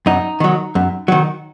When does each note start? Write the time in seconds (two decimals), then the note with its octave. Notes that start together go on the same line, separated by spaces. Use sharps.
0.06 F#2 D#4
0.40 D#3 F#3
0.75 F#2
1.08 D#3 F#3